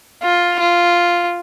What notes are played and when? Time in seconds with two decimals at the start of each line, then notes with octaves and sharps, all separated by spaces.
0.23 F4
0.60 F4